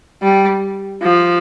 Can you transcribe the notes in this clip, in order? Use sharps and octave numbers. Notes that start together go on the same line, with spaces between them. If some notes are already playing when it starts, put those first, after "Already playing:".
G3
F3